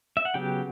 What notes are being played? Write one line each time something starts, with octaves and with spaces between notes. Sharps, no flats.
E5
F#5
C#3 F#3 B3 G4 G5